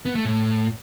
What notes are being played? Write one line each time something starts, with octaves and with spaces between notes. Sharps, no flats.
B3
A3
A2